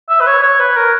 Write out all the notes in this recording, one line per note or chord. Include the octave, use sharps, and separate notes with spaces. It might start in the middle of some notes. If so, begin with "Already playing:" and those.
E5
B4
C#5
C#5
B4
A#4